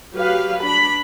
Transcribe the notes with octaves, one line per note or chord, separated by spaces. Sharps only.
F#3 G4 B4 F5
D4 B5